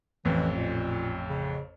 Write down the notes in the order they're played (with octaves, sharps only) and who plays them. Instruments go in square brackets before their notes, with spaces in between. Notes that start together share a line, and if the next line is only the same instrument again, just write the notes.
[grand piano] A1 F2 [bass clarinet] E3
[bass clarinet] A#2
C#3